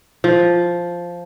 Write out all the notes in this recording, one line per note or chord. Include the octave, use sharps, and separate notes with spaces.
F3